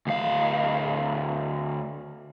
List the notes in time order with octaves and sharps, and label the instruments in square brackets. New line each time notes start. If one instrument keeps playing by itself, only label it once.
[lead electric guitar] D2 F5